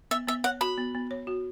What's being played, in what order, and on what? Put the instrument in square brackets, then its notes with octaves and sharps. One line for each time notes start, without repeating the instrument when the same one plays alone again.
[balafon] B3 [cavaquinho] E5
[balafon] B3 [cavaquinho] E5
[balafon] C#5 [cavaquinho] F#5
[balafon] F#4 [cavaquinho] B5
[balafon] B3
B3
C#5
F#4